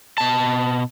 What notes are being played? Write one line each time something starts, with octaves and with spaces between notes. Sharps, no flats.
B2 A5